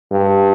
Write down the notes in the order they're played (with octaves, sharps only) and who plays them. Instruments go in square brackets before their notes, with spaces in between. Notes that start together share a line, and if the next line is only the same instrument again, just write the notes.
[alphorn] G2